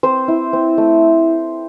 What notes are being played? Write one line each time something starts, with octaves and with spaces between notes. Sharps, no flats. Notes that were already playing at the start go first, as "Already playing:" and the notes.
C4 C5
E4
C4
A3